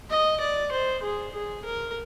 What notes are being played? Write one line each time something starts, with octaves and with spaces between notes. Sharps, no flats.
D#5
D5
C5
G#4
G#4
A#4